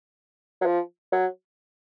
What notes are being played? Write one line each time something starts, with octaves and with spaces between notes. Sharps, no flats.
F#3
F3
F#3